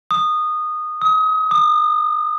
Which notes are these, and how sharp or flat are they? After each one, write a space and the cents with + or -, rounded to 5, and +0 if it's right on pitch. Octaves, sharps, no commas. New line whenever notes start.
D#6 -15
D#6 +30
D#6 -35